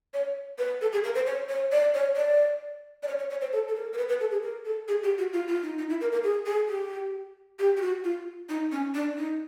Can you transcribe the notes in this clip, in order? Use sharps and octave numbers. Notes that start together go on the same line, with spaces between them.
C#5
B4
A4
G#4
A#4
C5
C#5
C#5
D5
C#5
D5
D5
C#5
C#5
C#5
C5
A4
A4
A#4
A#4
B4
B4
A4
G#4
A#4
A4
G#4
G4
F#4
F4
F4
D#4
D#4
E4
A#4
A#4
G#4
G#4
G4
G4
G4
F#4
F4
D#4
C#4
D4
D#4